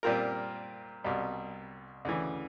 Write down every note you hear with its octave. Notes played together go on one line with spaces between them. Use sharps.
A#2 G3 C4 F4 A#4
C2 B2 G3
D2 C#3 E3